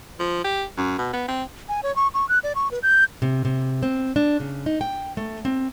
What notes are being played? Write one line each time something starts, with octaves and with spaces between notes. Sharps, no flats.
F3
G4
F#2
B2
B3
C4
G#5
C#5
C#6
C#6
F#6
D5
C#6
B4
G6
C3
C3
C4
D4
C#3
D#4
G5
A3
C4